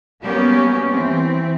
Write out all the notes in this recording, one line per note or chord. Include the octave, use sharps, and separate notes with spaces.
F#3 G3 A#3 B3 C#4 G4
E3 C4